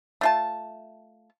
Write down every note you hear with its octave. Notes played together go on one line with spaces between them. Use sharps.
A3 F4 A5